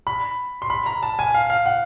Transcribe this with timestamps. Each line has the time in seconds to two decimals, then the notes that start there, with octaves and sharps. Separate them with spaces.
0.07 B5
0.62 C6
0.70 B5
0.86 A#5
1.03 A5
1.19 G#5
1.34 F5
1.50 F5
1.66 F#5